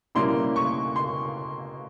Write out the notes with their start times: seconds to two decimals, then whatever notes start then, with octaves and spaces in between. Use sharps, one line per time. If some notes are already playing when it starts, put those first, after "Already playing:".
0.15 B2 G3 A#3 C#4 E4 C6
0.56 C#6
0.96 C6